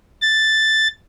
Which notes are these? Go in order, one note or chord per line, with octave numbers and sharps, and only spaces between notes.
A6